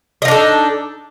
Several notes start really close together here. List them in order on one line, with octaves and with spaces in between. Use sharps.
D#5 D#4 D4 A4